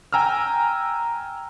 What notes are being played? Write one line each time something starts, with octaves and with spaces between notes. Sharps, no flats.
G5 G#5 A#5 E6 F6